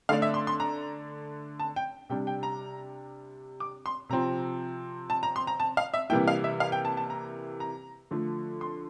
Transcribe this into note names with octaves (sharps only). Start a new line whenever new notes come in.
D3 A3 D4 F5
E5
C6
C6
A#5
A5
G5
C3 G3 D4 G5
G5
A#5
D6
C6
C3 F3 C4 A#5
A5
A#5
C6
A#5
A5
F5
E5
C3 E3 G3 A#3 E4 G5
F5
E5
F5
G5
A5
A5
A#5
A#5
D3 F3 A3
C6